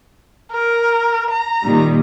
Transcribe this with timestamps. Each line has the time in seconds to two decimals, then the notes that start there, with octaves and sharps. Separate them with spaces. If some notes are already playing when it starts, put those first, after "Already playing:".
0.51 A#4
1.30 A#5
1.65 A#2 D#3 G3